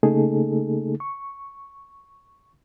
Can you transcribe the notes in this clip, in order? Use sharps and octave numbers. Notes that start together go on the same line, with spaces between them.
C#3 A3 A#3 D#4 G#4 A4
C#6